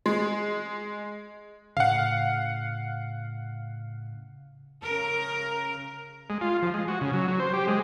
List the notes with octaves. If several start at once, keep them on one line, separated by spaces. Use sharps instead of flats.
G#3
A2 C#3 F5 F#5
C#3 A#4
G#3
F4
F3
G#3
F#4
C#3
F#3
F#3
C5
G4
G#3